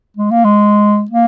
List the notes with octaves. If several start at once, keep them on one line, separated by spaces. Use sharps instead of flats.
G#3
A#3
G#3
A#3